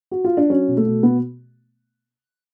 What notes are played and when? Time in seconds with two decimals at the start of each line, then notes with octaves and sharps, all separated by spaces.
0.11 F#4
0.24 F4
0.37 D4
0.50 F#3 C#4
0.68 B2
0.77 A3
0.86 B2
1.03 B2 B3